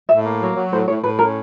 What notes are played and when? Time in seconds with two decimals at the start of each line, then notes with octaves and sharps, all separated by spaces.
0.09 A2 E5
0.25 A#3
0.40 F#3
0.56 F#3
0.72 A2 C5
0.88 A2 C#5
1.03 A2 B4
1.19 C#4 A#4